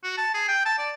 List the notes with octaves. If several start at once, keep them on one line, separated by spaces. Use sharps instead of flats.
F#4
A5
G#4
G5
A5
D5